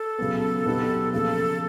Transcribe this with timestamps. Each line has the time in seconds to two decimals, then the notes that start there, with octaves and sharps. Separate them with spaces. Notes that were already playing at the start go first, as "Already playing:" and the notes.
Already playing: A4
0.18 C#3 F#3 B3
0.66 B2 F#3 B3 D#4 G4
1.13 C#3 F3 A#3 A4